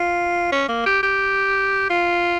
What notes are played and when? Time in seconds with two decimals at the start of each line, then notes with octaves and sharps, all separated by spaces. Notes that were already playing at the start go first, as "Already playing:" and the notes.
Already playing: F4
0.52 C#4
0.68 A#3
0.86 G4
1.03 G4
1.90 F4